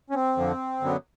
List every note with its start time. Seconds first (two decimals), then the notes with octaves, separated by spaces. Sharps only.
0.10 C#4
0.15 C4
0.37 F2 D3 F3
0.80 F#2 D3 F#3 B3